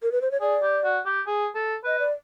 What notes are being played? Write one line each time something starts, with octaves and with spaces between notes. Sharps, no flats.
A#4
B4
C5
C#5
G#4 D5
G4
F#4
G4
G#4
A4
B4 D#5
D5